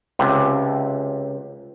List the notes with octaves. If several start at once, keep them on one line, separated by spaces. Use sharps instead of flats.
C#2 C3